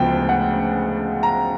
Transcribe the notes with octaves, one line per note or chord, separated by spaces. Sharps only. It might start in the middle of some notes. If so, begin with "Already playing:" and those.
Already playing: D2 C#3 F3 G#3 B3 G5
F#5
A#5